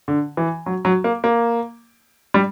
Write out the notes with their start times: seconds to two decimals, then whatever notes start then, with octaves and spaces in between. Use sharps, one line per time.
0.08 D3
0.37 E3
0.66 F#3
0.85 F#3
1.04 A#3
1.24 A#3
2.34 G3